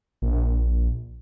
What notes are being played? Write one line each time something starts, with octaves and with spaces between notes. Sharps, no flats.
A#1